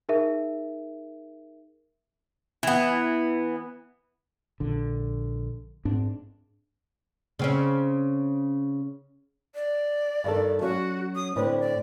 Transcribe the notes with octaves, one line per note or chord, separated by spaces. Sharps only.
D#4 G#4 A#4 E5
E3 B3
A#1 D3
G#2 C4 D4
C#3 C4 C#4
D5
G2 D#3 A4
F#3 C#4 F#4 C#5
D#6
A2 D3 C4 B4
D5